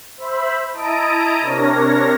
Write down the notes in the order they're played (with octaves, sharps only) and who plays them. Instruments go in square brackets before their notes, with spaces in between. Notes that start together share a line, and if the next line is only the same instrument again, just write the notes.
[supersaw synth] C5 E5 B5
E4 D#5 A5 A#5 D#6 D7
C3 D4 A#4 C#5 A#6